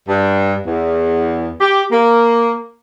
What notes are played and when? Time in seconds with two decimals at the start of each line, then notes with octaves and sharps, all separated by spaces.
0.08 G2
0.66 E2
1.60 G4
1.91 A#3